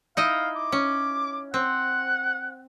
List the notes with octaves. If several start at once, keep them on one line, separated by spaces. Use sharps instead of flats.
D#4 E4 D#5 F5
D6
C#4
C4 F#5